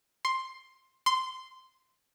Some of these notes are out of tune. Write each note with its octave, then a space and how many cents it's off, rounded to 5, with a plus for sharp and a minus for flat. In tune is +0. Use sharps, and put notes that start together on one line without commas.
C6 +10
C6 -10